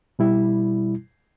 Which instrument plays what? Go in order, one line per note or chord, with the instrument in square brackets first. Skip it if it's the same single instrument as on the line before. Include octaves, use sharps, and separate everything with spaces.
[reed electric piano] B2 G3 E4